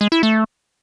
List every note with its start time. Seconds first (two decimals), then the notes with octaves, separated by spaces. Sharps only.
0.01 G#3
0.12 E4
0.23 A3